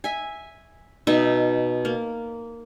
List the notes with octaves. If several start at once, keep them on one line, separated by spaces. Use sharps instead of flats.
E5 G#5
B2 D#4 E5
A#3